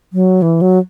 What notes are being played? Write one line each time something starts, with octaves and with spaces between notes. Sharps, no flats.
F#3
E3
F#3